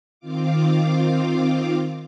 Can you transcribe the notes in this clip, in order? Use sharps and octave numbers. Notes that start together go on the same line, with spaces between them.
D#3 C4 F4 F5 D6